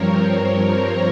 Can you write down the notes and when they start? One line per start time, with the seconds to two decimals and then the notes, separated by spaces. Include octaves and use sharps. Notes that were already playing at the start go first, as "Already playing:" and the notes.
Already playing: G2 F3 C4 A#4 C#5
0.68 A#4 C#5